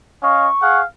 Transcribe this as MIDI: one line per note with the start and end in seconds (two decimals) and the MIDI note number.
0.23 0.48 61
0.23 0.48 75
0.23 0.48 77
0.23 0.80 85
0.62 0.82 68
0.62 0.82 77
0.62 0.82 78